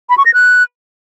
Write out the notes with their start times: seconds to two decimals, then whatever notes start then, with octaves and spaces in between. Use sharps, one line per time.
0.10 B5
0.18 C#6
0.26 A#6
0.34 F#6